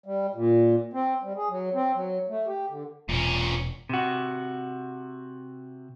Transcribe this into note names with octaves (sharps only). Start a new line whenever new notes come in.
G3
A#2
C4
G3
G#4
F#3
C4
F#3
A3
G4
D3
E1 A#2 C#4
C3 F#4